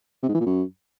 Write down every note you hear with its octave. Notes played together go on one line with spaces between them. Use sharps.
C3
G#2
E3
A#2
F#2